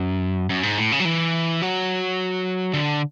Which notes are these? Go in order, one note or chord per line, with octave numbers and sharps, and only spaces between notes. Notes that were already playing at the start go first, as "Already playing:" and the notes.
Already playing: F#2
F#2
G#2
A2
C#3
F#3
E3
F#3
D3